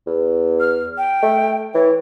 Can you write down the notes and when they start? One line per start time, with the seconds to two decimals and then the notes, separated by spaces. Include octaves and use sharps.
0.07 E2
0.60 F6
0.98 G5
1.22 A3
1.75 E3 C#5